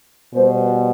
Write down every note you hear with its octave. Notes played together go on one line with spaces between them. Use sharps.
B2 G3 B3 C5